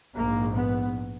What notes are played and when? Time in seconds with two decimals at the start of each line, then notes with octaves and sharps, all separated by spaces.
0.17 A#1 G#2 A#3
0.56 B3